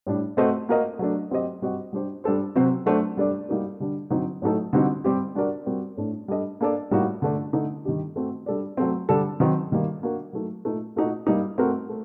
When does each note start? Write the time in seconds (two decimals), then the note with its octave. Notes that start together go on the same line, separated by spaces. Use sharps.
0.07 A2 G3 D4
0.37 A3 C4 F#4 C5 D#5
0.69 A#3 F#4 A#4 D#5
0.99 F#3 A3 D4
1.31 F#3 C4 G4 C5 D#5
1.62 G3 C4 F#4 C5 D#5
1.93 G3 D4 G4 C5
2.24 G3 D4 A4 C5
2.56 C3 F#3 C4 F#4 C5
2.86 F#3 A3 D4 F#4 C5
3.17 G3 D4 A4 D5
3.49 G3 A#3 D#4 F#4 A#4
3.80 D3 G3 D4
4.10 D3 F#3 C4 D#4
4.42 A2 F#3 A3 D#4 A4
4.73 D3 G3 C4 D#4 F#4
5.04 G3 C4 G4
5.35 G3 D4 F#4 A#4 D5
5.66 G3 C4 F#4 A#4
5.97 A2 A3 D4
6.28 G3 D4 A4 D#5
6.61 A#3 D4 A4 D5
6.91 A2 G3 A#3 D#4 F#4
7.22 D3 A3 D4
7.53 D3 A3 D#4
7.85 D#3 G3 D4 G4
8.16 A3 C4 F#4
8.46 G3 D4 A4 D5
8.77 F#3 A3 C4
9.09 D3 G3 D4 A4
9.40 D#3 F#3 C4 D#4
9.72 D#3 G3 A#3
10.03 A#3 D4 F#4 A#4
10.33 F#3 A3 D#4
10.65 A#2 A3 D#4
10.96 A#2 A3 D#4 F#4
11.27 G3 A#3 D#4
11.58 A3 C4 F#4 A#4
11.89 A3